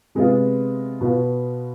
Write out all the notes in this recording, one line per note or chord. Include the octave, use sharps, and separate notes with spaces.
C3 G#3 B3 F4
B2 B3 F4